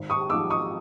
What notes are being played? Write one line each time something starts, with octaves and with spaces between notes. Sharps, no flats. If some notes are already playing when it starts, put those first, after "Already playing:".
Already playing: G#1
C#6 D#6
G#2 F3 D6 E6
C#6 D#6